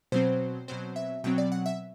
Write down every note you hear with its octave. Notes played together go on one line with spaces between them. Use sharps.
B2 F#3 C4 C5
B2 F#3 C4 C5
E5
B2 F#3 C4 G5
D5
F#5
E5